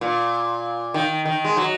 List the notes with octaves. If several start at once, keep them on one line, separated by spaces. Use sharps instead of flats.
A#2
D#3
D#3
G#3
F#3